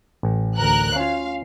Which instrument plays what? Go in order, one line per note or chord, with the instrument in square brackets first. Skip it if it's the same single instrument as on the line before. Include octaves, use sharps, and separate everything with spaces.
[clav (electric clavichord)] A1
[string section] D2 A#4 F#6
[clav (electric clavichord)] C#4 F4 [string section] F5